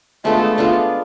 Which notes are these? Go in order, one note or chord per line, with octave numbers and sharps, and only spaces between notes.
G#3 A3 B3 D4 F4
G#3 B3 D4 F4